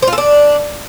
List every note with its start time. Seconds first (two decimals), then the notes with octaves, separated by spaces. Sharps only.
0.02 C5
0.08 F4
0.13 A4
0.18 D4